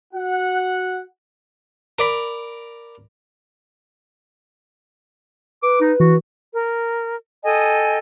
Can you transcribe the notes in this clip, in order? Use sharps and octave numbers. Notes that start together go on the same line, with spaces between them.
F#4 F#5
A#4 D5 B5
B4 D6
D#4
E3 F#4
A#4
A4 D#5 G5 G#5